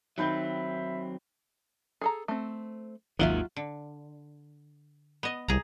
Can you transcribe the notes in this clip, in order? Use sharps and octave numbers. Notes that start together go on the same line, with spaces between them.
D#3 F#3 C4 E5 B5 G6
G#4 A4 A#5
A3 C4
G#1 D#2 D#3 F#3 F4 E5
D3
B3 D#5
C2 G#4 A#5